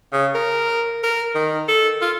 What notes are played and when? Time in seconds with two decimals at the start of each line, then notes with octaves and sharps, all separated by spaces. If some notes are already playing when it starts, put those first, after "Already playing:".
0.13 C#3
0.34 A#4
1.03 A#4
1.34 D#3
1.68 A4
2.01 F4